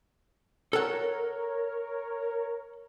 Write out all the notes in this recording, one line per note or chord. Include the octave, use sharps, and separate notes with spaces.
A4 A#4 C#5 F#5